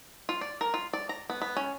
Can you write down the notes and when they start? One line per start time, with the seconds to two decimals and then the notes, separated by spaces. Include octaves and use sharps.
0.29 F4
0.41 D5
0.61 A#4
0.74 F4
0.93 D5
1.09 A#5
1.30 B3
1.41 B3
1.57 C#4